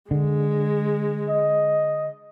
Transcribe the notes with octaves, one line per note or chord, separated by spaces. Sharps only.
D3 G#3
D#5